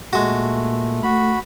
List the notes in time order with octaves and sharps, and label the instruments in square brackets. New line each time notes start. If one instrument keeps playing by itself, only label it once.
[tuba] A#2 [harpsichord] G#3 F#4 [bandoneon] A3
[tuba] A3 [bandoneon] F#4 B5